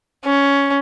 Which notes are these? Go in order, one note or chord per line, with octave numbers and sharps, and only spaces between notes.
C#4